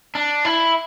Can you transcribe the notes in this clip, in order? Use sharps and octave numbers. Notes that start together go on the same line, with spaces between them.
D4
E4